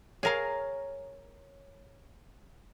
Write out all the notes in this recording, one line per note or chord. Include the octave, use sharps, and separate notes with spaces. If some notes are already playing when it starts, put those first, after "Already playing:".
G#4 A#4 C#5 F5 A#5